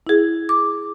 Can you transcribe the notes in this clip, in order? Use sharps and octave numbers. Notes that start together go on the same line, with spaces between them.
E4 G#4
D6